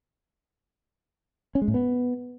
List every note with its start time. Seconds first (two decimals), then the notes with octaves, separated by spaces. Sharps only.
1.55 C#4
1.62 G#3
1.68 A2
1.74 B3